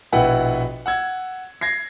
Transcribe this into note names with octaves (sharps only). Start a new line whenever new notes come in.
A#1 B2 E4 B4 F#5 G5
F#5 E6 G#6
G#6 A#6 C7